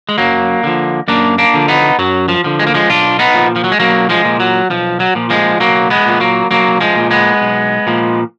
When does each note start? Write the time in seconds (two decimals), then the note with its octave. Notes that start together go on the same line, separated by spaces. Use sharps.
0.09 G#3
0.18 F#2 F#3 A#3
0.63 D3 F3
1.08 F#2 A#3 D4
1.38 A#3 D4
1.53 D3 F3
1.68 B3 D#4
1.99 F#2 F#3
2.28 F3
2.44 D3 F3
2.59 G#3
2.67 A#3
2.74 F3 G#3
2.89 B1 D4 F4
3.19 B3 D#4
3.34 A#2 F3
3.56 F3
3.64 F#3
3.72 G#3
3.80 B1 F#3 A#3
4.09 F3 G#3
4.24 A#2 F3
4.40 F#3
4.70 B1 F3
5.00 F#3
5.15 A#2 F3
5.30 F3 G#3
5.60 B1 F#3 A#3
5.90 G#3 B3
6.06 A#2 F3
6.20 F#3 A#3
6.51 B1 F#3 A#3
6.81 F3 G#3
6.96 A#2 F3
7.11 G#3 B3
7.41 B1
7.87 A#2 F3